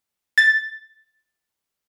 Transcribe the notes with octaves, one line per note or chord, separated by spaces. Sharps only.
A6